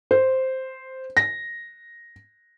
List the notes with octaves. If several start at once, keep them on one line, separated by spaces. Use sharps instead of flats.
C5
A#6